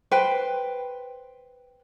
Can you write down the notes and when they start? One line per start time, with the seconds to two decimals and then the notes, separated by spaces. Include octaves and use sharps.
0.11 B4 C5 G5